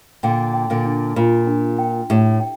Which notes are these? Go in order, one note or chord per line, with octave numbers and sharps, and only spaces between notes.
A#2 D3 G5
G5
A#2 D3
D4
A#2 F4
D4
G5
A2 G4
G5